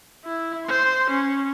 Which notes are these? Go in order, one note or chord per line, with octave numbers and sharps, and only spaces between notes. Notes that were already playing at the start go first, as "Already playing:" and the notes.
E4
C5 C6
C#4